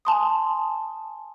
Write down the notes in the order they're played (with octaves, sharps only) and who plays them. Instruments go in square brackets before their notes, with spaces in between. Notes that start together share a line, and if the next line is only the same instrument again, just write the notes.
[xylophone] G#5 A5 C6 D#6